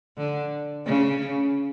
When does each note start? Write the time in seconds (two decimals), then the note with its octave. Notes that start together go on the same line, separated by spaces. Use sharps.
0.18 D3
0.86 C#3